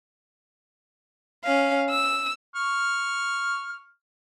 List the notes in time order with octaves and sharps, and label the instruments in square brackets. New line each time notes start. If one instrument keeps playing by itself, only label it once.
[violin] C#4 F5
E6
[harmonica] C#6 F6